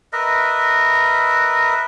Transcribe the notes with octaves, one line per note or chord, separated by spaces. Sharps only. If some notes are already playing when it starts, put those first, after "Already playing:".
A#4 B4 D#5 E5